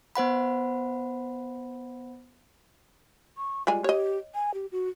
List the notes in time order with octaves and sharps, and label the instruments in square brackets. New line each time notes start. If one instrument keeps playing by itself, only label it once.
[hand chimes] B3 C5 F#5 B5
[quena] C#6
[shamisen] G3 G#3 G#5 [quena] F4
[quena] G4 [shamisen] C#5 D#5
[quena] G#5
G4
F#4